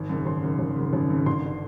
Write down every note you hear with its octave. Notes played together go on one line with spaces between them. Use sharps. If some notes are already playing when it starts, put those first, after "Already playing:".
Already playing: G#1
F#2 C#3
G#1 C6
F#2 C#3
G#1
F#2 C#3
G#1
F#2 C#3
G1 C6
D3